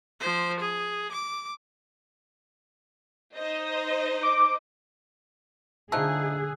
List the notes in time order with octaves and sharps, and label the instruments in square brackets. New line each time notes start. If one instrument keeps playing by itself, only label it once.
[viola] F3 C5
G#4
D6
[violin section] D#4 C5 D#5
[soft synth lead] D6
[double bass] D3 [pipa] F3 A3 D#4 [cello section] G#4 [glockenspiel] E6 F#6